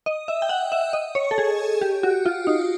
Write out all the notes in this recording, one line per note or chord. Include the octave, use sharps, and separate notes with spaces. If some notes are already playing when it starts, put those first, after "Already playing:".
D#5
E5
G5
F#5
E5
D#5
C#5
A4
G#4
G4
F#4
F4
D#4